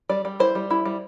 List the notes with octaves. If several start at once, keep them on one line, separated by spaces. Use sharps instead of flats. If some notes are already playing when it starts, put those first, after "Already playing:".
G3 D5
G3
E4 C5
G3
E4
G3